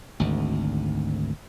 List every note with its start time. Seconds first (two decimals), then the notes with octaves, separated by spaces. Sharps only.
0.20 G#1 D2